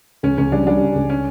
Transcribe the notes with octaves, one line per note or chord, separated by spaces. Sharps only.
C#2 C#4
C#2 C#4
G3 D4
G3 D4
C#3
C#2
C#4